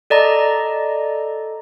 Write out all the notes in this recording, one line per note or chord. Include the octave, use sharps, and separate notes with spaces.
A4 D5 D#5 A#5